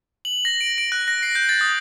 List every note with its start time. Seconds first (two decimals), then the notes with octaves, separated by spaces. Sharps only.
0.25 F#7
0.45 A#6
0.61 D7
0.78 D7
0.92 F#6
1.08 A#6
1.23 C7
1.35 G6
1.49 A6
1.61 D#6